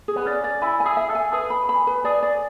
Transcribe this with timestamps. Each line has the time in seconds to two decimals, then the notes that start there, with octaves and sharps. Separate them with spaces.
0.08 G#4
0.16 B3
0.26 C#4 D5
0.44 D5
0.62 E4 G#5
0.80 G#5
0.86 G#4
0.97 E5
1.10 A4
1.15 G#5
1.33 G#4 B4
1.50 B5
1.69 B5
1.87 B4
2.04 G#4 D5
2.23 D5